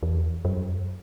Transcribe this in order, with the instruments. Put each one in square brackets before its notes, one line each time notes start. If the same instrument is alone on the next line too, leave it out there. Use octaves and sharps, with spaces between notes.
[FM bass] E2
F#2